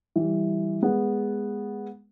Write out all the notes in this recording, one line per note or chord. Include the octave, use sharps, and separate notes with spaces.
E3 G3
G#3 B3